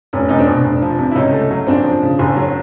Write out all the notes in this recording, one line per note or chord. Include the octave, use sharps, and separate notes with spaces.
F1 C#4
F1 D#4
C4 D4
B2
F1
F3
C3
E4
C#2 C#4 D#4
A3
F#3
F#1 C4 D4
F3
C#3
F#1
F#3